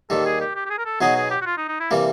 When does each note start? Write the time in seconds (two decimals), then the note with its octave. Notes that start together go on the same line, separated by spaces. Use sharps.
0.10 D#2 D#3 G3 A4
0.26 G#4
0.40 G4
0.55 G4
0.66 G4
0.70 G#4
0.78 A#4
0.85 A4
1.01 B2 F#3 B3 D#4 G#4
1.16 G#4
1.31 G4
1.41 F#4
1.46 F4
1.57 D#4
1.68 D#4
1.80 E4
1.91 C3 E3 G3 A#3